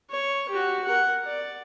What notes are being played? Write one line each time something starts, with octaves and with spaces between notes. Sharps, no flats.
C#5
F#4 G4
A#4 F#5
D5